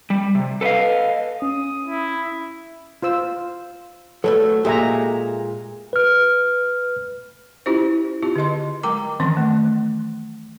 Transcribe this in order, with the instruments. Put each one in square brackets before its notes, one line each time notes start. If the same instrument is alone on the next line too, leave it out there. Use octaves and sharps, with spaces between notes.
[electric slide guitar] G3
C3
A4 B4 D5 D#5 F5
[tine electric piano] C#4 [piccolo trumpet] D#6
[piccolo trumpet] E4
[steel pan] F4 C5 E6
[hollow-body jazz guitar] F#3 G#3 A3 [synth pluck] A4 [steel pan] B4
[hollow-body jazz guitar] A#2 G#3 [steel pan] G4 E5 A#5
[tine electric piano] B4 F6
[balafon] C#4 E4 F4 G4 C5
C4 F4 G4
D3 G#4 D#5 C6
F#3 G#3 A#4 G5 A#5 D6
D#3 E3 F#3 C4 C#4 C#6
A3